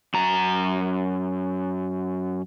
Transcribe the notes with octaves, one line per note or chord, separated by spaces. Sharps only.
F#2 A#5